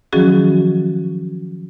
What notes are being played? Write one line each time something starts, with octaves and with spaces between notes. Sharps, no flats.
D#3 F3 F#3 C#4 F#4 G#4